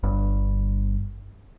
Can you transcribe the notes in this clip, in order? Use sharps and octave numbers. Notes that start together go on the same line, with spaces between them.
G1 G2